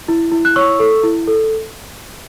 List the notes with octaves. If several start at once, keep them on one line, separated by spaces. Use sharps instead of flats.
E4
E4
F#6
C#5 C#6 E6
A4
E4
A4